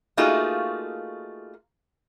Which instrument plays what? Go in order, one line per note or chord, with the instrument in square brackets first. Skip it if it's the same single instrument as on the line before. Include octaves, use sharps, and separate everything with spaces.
[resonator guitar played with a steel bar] A3 A#3 D#4 F4 F#4 G#4